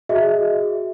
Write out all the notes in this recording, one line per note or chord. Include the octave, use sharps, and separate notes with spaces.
F#4 G#4 D#5 E5